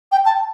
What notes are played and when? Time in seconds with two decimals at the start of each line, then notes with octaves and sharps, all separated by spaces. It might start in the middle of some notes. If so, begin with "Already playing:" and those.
0.12 G5
0.26 A5